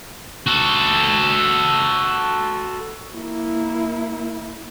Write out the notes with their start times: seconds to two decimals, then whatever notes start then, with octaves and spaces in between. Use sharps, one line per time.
0.47 F#4 A4
3.16 A#3 E4